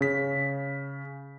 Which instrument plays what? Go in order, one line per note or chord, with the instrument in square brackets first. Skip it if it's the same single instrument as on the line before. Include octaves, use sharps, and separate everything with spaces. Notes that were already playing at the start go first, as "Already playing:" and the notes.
[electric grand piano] C#3 B6